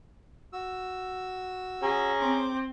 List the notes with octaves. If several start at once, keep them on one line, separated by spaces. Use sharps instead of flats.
F#4 E6
C#4 G#4 A#5
C4 C5 D6